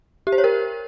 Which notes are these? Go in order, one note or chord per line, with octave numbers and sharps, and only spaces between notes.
G4
C5
C#5
A#4